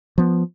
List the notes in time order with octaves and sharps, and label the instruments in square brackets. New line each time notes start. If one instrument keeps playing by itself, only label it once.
[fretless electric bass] F3 B3